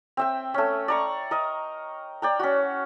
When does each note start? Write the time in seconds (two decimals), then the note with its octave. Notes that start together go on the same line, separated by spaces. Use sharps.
0.17 C4 E5 G5
0.54 A3 C#4
0.88 D5 A#5 C#6
1.31 A#4 D#5
2.22 D5 G5 A#5
2.39 C#4 F#4